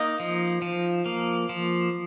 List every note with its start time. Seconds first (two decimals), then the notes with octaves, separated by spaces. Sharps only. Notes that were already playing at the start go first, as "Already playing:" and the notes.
Already playing: A#3 D#4 D#5
0.20 F3
0.62 F3
1.06 A#3
1.49 F3